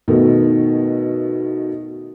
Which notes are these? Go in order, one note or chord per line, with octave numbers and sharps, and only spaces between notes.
B2 D#3 A3